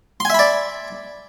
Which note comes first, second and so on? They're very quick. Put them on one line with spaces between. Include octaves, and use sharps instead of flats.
C6 G#5 E5 B5 D5